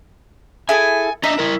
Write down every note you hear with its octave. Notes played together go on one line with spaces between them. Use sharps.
E4 G#4 A4 G#5
D4 D#5 E5 A#5
E4 A#4